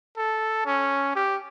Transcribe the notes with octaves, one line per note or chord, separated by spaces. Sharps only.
A4
C#4
G4